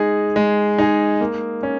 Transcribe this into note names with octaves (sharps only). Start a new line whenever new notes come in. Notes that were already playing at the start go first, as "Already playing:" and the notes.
Already playing: G#3 D#4 G#4
G#3
D#4 G#4
A#3
C#4